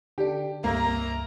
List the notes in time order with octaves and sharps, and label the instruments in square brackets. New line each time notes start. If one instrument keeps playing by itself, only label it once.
[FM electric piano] D3 D4 [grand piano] G4
[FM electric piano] C#2 G2 E5 [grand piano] A#3 [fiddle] A#5